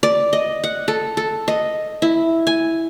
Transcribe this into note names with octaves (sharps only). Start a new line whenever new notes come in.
D5
D#5
F#5
A4
A4
D#5
E4
G#5